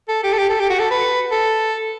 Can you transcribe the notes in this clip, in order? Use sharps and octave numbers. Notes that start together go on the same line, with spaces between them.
A4
G4
A4
G4
A4
G4
F#4
A4
B4
A4